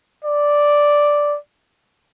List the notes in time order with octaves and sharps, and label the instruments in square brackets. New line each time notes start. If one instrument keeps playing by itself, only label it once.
[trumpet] D5